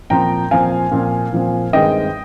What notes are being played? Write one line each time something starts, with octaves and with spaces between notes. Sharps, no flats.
A#2 F3 C4 G5 A#5
A#2 F3 C4 F5 G#5
A#2 F3 C4
A#2 F3 C4
G2 D#3 G#3 C4 D#5 G5